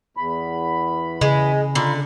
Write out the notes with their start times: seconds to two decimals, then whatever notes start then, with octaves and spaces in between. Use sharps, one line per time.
0.17 E2 B5
1.21 C#3 G#3
1.75 D3 F4 A#5 B5